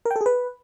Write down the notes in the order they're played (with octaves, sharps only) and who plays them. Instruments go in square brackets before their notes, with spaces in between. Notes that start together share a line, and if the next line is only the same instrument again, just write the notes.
[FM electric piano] A#4
G5
A4
G#4
B4